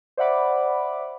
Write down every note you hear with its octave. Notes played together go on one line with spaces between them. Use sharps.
C5 D5 E5 F#5 B5 D6